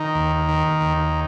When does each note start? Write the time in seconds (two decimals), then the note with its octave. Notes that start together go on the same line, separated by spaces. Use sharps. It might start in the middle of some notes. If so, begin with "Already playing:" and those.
Already playing: D#3 D#4
0.15 D#2
0.48 D#3
0.81 D#2